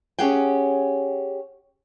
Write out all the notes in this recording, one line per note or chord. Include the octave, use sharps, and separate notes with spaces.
C#4 G4 G#4 F#5 G5